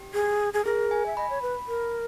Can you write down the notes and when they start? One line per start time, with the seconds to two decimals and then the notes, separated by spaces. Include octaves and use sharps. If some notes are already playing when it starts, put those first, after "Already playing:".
Already playing: G4
0.14 G#4
0.54 G#4
0.65 G#4 A#4
0.91 G#5
1.06 E5
1.17 D#5 B5
1.30 C#5
1.42 B4
1.68 A#4